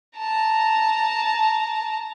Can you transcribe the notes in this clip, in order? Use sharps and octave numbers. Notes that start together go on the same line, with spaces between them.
A5 A#5